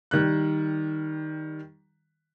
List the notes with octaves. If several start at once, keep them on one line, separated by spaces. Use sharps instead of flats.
D#3 G3 F#6